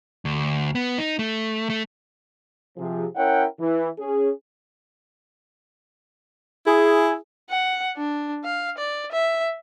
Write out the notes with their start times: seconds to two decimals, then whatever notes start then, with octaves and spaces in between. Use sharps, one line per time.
0.25 D2
0.75 B3
0.98 D#4
1.19 A3
1.70 A3
2.77 C3 F3 G#4
3.16 C#4 E4 A#4 C#5 F#5 G5
3.60 E3
3.99 C#4 G#4
6.66 E4 G#4
7.50 F#5
7.97 D4
8.44 F5
8.78 D5
9.12 E5